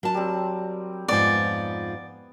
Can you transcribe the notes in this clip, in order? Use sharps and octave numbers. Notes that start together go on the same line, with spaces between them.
F#3 A#4 A5
G3 C4
F2 G#2 F3 B3 D5 G#5